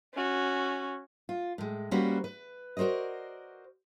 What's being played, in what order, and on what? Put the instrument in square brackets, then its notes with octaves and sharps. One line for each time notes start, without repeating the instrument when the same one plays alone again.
[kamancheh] C#4 F#4
[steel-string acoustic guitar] F4
A2 G#3
G3 A#3 C#4 F#4 B4 C5
B4
F#4 A#4 C5 D5 D#5